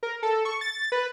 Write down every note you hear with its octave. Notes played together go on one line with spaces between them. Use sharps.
A#4
A4
C#6
A6
B4